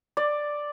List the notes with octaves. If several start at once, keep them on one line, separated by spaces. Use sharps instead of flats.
D5